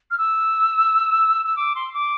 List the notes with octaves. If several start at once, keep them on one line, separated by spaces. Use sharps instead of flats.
F6
E6
E6
D6
C6
D6